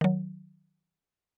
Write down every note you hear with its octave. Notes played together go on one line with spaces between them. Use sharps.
D#3 F#3